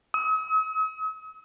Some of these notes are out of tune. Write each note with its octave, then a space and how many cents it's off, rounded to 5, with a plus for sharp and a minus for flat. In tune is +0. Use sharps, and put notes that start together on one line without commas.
D#6 +45